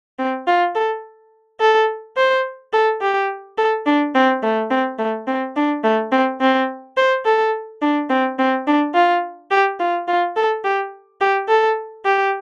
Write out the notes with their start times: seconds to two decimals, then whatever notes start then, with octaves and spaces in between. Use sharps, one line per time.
0.19 C4
0.47 F4
0.75 A4
1.61 A4
2.17 C5
2.73 A4
3.01 G4
3.58 A4
3.86 D4
4.15 C4
4.43 A3
4.70 C4
4.98 A3
5.27 C4
5.56 D4
5.84 A3
6.12 C4
6.41 C4
6.97 C5
7.25 A4
7.82 D4
8.09 C4
8.39 C4
8.67 D4
8.94 F4
9.51 G4
9.80 F4
10.08 F4
10.36 A4
10.64 G4
11.21 G4
11.48 A4
12.05 G4